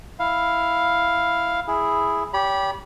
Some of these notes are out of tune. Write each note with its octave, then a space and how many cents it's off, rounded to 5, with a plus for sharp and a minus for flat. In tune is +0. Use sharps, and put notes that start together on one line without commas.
E4 +0 F5 +0
E4 +0 G#4 +0
G4 +0 C#5 +45 B5 -25